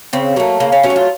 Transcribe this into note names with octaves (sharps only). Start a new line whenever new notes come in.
C#3 C4
F#3 A3 A#3
C#3 A#3
C#4
F#3 A3 C#4
F#4
F4